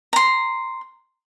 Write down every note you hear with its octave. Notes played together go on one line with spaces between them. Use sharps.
A#5 C6